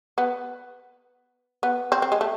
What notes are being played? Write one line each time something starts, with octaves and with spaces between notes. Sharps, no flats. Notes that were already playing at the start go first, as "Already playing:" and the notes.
B3
B3
C4
C4
G#3
A3